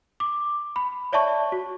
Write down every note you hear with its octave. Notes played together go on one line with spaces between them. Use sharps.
D6
B5
C#5 D5 E5 A5 C#6
F#4